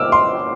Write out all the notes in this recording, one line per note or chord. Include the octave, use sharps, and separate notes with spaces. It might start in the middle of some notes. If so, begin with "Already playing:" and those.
Already playing: D6 E6 F6
C6